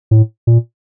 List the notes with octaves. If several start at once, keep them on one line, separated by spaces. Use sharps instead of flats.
A2
A#2